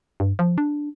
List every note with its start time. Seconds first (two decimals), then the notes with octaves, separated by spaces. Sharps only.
0.20 G2
0.39 F3
0.58 D4